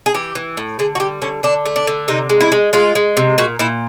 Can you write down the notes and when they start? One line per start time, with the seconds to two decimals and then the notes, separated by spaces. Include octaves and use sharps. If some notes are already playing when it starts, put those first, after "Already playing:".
0.06 G#4
0.14 E3 G4
0.35 E3
0.57 A2
0.79 D3 G#4
0.95 F#4
1.00 G3 G4
1.22 D3 C#4
1.43 D3 D4
1.66 A3
1.76 D4
1.87 D3
2.08 C3 D#4
2.30 G#3
2.41 E4
2.52 G#3
2.73 G#3 F4
2.95 G#3
3.17 C3
3.38 A#2 F#4
3.59 A#2 E4